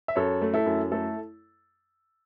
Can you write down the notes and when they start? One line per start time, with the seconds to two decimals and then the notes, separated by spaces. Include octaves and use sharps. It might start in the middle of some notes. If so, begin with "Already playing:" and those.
0.08 E5
0.16 F#2 A4 C#5
0.42 A3
0.54 E4 A4
0.66 F#2
0.91 A3 E4 A4